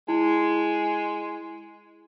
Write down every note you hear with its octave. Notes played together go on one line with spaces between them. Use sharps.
G#3 E4